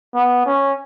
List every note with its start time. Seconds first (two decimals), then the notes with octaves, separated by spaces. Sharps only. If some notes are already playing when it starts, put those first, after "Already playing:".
0.15 B3
0.46 C#4